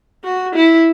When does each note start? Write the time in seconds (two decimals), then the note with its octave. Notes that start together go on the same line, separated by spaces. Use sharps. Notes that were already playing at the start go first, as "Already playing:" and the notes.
0.24 F#4
0.55 E4